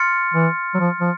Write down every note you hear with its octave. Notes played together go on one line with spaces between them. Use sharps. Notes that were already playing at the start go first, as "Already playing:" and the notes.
Already playing: C6 F6 A6 C#7
E3
F#3
F3
F3